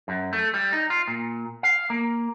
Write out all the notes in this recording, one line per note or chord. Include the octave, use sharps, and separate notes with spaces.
F#2
A3
G3
D#4
F4
A#2
F5
A#3